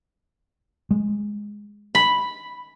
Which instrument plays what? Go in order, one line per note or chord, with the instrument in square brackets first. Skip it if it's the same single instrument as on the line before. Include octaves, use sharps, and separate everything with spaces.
[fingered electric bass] G#3
[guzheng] B5